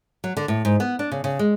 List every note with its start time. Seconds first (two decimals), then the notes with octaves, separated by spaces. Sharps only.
0.24 F#3
0.37 D3
0.48 A2
0.65 G#2
0.80 B3
0.99 D4
1.12 C#3
1.24 C#3
1.39 G#3